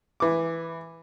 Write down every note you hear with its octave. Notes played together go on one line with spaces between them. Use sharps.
E3 D6